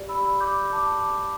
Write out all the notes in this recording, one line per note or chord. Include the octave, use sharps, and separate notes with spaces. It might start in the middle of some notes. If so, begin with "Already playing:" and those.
Already playing: G4 D5
B5 E6
D6 G6
A5 D6